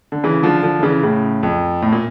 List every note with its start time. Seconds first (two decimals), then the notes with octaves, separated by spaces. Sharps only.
0.12 D3
0.24 C#3 E3
0.43 D3 F3
0.63 D3 F3
0.79 D3
0.83 C#3 E3
1.03 A2 C#3
1.43 F2
1.82 A2
1.92 A#2